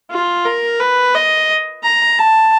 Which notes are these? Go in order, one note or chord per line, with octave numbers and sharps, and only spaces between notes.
F4
A#4
B4
D#5
A#5
A5